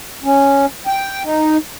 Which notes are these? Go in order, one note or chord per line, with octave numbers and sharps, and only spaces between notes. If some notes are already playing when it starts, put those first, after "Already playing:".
C#4
G5
D#4